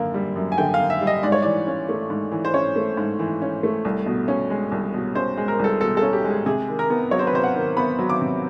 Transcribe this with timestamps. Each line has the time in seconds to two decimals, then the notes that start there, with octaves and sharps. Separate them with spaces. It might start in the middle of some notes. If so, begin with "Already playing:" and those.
Already playing: F#2 D3 A#3
0.14 G3
0.36 F#2
0.52 G#5
0.58 D3 G5
0.74 F5
0.80 A#3
0.90 E5
1.01 G3
1.07 D#5
1.23 G#2 D5
1.32 C#5
1.42 E3 D5
1.67 C#4
1.89 A3
2.10 G#2
2.32 E3
2.45 C5
2.54 C#4 C#5
2.76 A3
2.97 G#2
3.19 E3
3.42 C#4
3.63 A3
3.85 C2
4.06 B2
4.28 C#4
4.50 G#3
4.72 C2
4.94 B2
5.15 C#4 C5
5.38 G#3
5.48 A#4
5.59 C2 A4
5.81 B2 A4
5.97 A4
6.02 C#4
6.13 G4
6.24 G#3
6.30 G#4
6.46 C3 G#4
6.69 D#3
6.79 A#4
6.90 B3
7.11 F#3 C#5
7.19 C5
7.27 B4
7.33 C3 C5
7.44 F#5
7.55 D#3
7.77 B3 B5
7.99 F#3
8.10 D6
8.21 C3